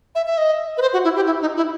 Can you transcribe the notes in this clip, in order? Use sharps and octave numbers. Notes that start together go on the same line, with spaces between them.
E5
E5
D#5
B4
C5
F#4
E4
G4
E4
D#4
E4